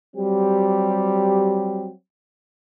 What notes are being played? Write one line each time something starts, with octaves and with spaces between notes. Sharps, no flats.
F#3 G3 C4 G4